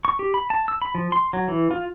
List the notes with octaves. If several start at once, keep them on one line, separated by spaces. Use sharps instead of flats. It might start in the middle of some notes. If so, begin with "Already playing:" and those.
C#6
G4
B5
A5
E6
B5
F3
C6
F#3
E3
F4